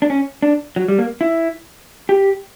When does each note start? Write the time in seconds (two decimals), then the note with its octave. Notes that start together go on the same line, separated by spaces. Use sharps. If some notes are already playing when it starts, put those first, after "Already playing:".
0.02 D4
0.10 C#4
0.43 D4
0.76 F#3
0.88 G3
0.99 A#3
1.21 E4
2.09 G4